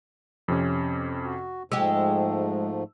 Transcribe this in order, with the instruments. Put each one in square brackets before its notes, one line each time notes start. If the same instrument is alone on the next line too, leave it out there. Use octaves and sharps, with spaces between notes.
[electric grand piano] F2 C3 C#4
[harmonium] F#4
[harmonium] G#2 F3 A3 [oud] G#3 G4 [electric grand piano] E6